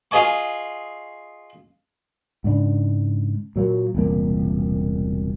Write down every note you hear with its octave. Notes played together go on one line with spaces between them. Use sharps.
F4 G#4 D#5 G#5 C#6
G#2 C#3 D4
A#2 F#3 A#3
E1 C2 A#2 A#3